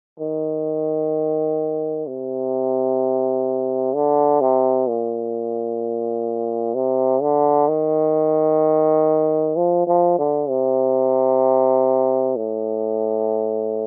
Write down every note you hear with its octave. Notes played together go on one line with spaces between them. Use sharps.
D#3
C3
D3
C3
A#2
C3
D3
D#3
F3
F3
D3
C3
A2